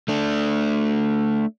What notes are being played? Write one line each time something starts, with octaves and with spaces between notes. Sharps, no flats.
A3 D4